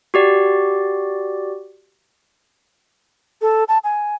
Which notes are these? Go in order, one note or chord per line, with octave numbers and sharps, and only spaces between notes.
F#4 G4 D5
A4
A5
G#5